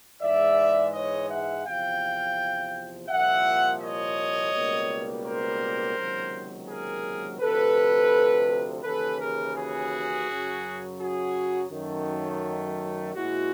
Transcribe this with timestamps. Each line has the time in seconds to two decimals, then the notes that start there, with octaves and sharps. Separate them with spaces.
0.22 G#2 E3 G#3 D5 E5
0.93 C#5 D#5
1.30 E5 F#5
1.65 E2 C3 F3 F5 G5
3.09 C2 A#2 F3 A#3 E5 F#5
3.81 C#5 D#5
4.53 C#2 B2 G3 A#3
5.24 A#4 C5
5.97 C#2 C3 D#3 F#3 A#3
6.68 G#4 A#4
7.40 D2 C3 F3 A4 B4
8.83 D#2 C#3 E3 A4 B4
9.20 G#4 A#4
9.55 F#4 G#4
10.28 F#2 C#3 F#3
10.99 F#4 G#4
11.71 F#2 D#3 F#3 A3
13.14 A#2 F3 G#3 E4 F#4